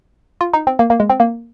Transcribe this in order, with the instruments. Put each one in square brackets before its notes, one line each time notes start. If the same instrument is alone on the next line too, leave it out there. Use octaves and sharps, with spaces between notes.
[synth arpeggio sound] F4
D#4
C4
A#3
A#3
G#3
C4
A#3